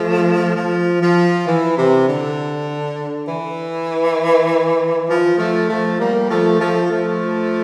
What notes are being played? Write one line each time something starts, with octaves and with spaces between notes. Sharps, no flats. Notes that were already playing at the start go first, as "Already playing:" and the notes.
Already playing: F3 A3
F3
F3
E3
C3
D3
E3
F3
F3 A3
F3 A3
G3 A#3
F3 A3
F3 A3
F3 A3